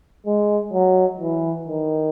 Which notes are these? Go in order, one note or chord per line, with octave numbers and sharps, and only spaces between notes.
G#3
F#3
E3
D#3